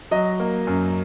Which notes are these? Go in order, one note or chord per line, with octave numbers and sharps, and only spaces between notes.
F#3 D#5
A#3
F#2